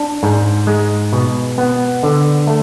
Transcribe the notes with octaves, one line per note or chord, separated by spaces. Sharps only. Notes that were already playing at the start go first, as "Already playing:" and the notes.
Already playing: D4
G#2
G#3
B2
B3
D3
A3